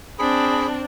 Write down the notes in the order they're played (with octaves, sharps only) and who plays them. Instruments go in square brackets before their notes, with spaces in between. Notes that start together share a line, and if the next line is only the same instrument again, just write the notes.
[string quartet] C4 D4 [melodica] G#4 B5